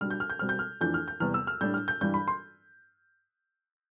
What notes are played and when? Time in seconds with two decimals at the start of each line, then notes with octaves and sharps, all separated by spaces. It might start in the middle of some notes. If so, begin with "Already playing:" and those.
0.01 B2 G3 D4 F6
0.10 G6
0.20 F6
0.30 G6
0.39 B2 G3 C4 F6
0.49 G6
0.59 F6
0.81 F2 E3 A3 D4 G6
0.94 F6
1.08 G6
1.20 E2 C3 G3 B3 F6
1.34 E6
1.47 F6
1.61 A2 G3 D4 G6
1.74 F6
1.88 G6
2.01 G2 E3 G3 D4 G6
2.14 B5
2.28 C6